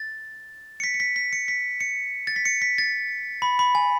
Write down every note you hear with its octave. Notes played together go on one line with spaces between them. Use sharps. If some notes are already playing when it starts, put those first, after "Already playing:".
Already playing: A6
C#7
B6
C#7
B6
B6
C#7
B6
C#7
A6
B6
C#7
B6
A6
B5
B5
G#5